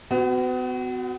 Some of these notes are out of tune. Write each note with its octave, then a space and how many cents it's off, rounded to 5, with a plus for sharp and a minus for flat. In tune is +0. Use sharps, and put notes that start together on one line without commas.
B3 +40 F#4 +0